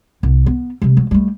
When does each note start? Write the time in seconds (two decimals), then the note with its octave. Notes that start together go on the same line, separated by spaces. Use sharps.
0.23 C2
0.46 B3
0.82 C3 G3
0.97 F#3
1.11 G3 A3